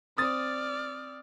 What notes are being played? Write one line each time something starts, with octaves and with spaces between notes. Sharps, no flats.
C4 D5 D#6 F6 A6